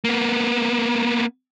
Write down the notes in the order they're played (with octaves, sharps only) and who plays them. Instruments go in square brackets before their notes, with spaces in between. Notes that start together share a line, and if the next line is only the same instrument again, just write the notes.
[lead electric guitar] A#3 B3